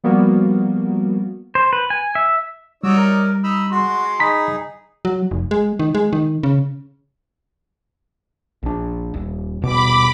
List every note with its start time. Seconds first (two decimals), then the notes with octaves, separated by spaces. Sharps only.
0.04 F3 G3 A#3 B3 F#4 A#4
1.55 C5
1.73 B4
1.90 G#5
2.15 E5
2.83 G3 D#4 F#4 C#5 D5 E6
2.97 A#4
3.44 D#4 B5 E6
3.71 G#3 F#4 C6
4.20 D#4 G#4 A#5 B5 B6
5.05 F#3
5.31 F1
5.51 G#3
5.79 D#3
5.95 G#3
6.13 D#3
6.43 C#3
8.63 A#1 D4
9.14 D#1
9.62 D#1 B2 B5 D6